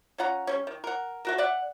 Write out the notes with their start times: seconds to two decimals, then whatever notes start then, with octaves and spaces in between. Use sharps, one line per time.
0.18 C#4 F4 F#5 A#5
0.47 G3 C#4
0.67 D#3
0.84 A#4 F#5
1.25 A3 F#4 A#4
1.38 D5 E5 F#5